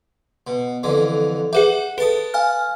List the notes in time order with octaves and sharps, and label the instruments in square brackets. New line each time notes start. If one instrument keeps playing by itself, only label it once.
[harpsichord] B2
F2 D3 E3
[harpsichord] G4 F#5 [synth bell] G#4 B4 E5
[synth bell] A4 [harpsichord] B4 A5 D#6
[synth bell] F5 G#5 F6